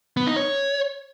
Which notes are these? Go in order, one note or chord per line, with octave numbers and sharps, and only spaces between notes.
B3
D#4
C#5